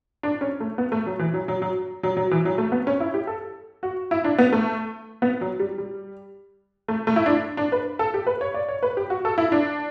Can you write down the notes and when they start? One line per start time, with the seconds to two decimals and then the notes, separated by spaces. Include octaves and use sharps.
0.23 D4
0.41 C#4
0.60 A3
0.78 B3
0.92 A3
1.06 F#3
1.19 E3
1.34 F#3
1.48 F#3
1.62 F#3
2.03 F#3
2.17 F#3
2.31 E3
2.45 F#3
2.58 A3
2.72 B3
2.87 C#4
3.00 E4
3.14 G4
3.27 A4
3.83 F#4
4.11 E4
4.24 D4
4.38 B3
4.52 A3
5.22 B3
5.41 F#3
5.59 G3
5.78 G3
6.88 A3
7.07 A3
7.16 E4
7.26 D4
7.57 D4
7.72 B4
7.99 A4
8.14 G4
8.27 B4
8.41 C#5
8.54 D5
8.69 C#5
8.83 B4
8.97 G4
9.10 F#4
9.25 A4
9.38 E4
9.52 D4